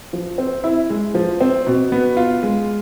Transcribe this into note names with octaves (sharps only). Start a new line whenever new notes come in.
F3
C4
E4
G#3
F3
C4
B2
B3
F4
G#3